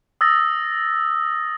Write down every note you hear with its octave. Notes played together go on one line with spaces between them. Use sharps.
D#6 E6 A6 A#6